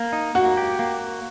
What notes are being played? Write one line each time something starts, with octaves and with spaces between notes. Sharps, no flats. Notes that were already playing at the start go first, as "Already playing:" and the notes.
Already playing: A#3
D#4
A#3 F#4
G4
A#3